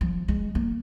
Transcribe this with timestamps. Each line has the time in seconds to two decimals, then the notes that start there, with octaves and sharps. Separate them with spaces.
0.01 F3
0.28 G#3
0.55 A#3